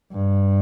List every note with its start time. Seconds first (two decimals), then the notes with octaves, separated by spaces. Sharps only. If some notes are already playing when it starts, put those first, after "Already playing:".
0.13 G2